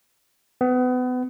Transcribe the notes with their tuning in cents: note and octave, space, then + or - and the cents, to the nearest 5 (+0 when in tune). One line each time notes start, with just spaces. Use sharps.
B3 +30